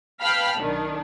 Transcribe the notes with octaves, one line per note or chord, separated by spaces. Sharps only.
B4 F5 G5 A5 B5 F6
B1 D#3 D4